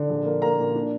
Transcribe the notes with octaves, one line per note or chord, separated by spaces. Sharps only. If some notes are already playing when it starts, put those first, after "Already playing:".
Already playing: D3
A#1
A#3
A#3 A#5
A#2
D4